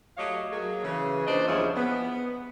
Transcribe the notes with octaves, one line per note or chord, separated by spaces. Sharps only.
F#3 A3 G4 C#5 D#5 F5
F#3 A#3 G#4
C#3 E3
A#2 D4 C5 D5 D#5
E2 G2 F3 C#4 G#4 E5
B3